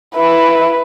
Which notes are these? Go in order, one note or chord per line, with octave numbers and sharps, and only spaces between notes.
E4 B4